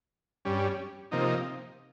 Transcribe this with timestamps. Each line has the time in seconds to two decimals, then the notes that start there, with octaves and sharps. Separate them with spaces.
0.45 G2 G3 C#4
1.11 C3 F3 A#3 D#4